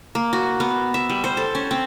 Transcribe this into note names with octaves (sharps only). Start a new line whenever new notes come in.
A#3
F#4
B3
E5
G3
C5
A4
C#4
C4